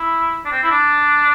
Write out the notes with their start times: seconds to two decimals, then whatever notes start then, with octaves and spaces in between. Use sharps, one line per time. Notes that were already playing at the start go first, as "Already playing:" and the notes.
Already playing: E4
0.45 D4
0.52 C4
0.63 E4
0.71 D4